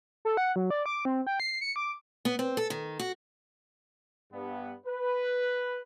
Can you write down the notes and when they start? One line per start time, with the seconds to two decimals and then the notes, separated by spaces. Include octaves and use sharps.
0.25 A4
0.37 F#5
0.56 F#3
0.70 D5
0.86 D6
1.05 C4
1.27 G5
1.40 C7
1.61 C#7
1.76 D6
2.25 B3
2.39 C4
2.57 A4
2.70 D#3
2.99 F#4
4.33 G2 B3
4.87 B4